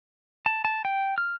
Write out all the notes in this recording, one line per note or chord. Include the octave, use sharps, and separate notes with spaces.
A5
A5
G5
F6